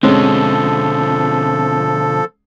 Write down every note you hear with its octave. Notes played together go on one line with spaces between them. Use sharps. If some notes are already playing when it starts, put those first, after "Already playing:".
B2 D3 F3 G#3 C4 C#4 A4